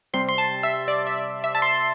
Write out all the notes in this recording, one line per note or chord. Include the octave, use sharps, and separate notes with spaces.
C3 G3 C4 C6
C6
A5
E5
D5
E5
E5
A5
C6